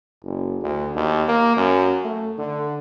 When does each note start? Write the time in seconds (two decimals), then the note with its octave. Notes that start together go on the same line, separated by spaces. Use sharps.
0.24 F#1
0.62 D2
0.95 D#2
1.28 A#3
1.57 F#2
2.05 A3
2.38 D3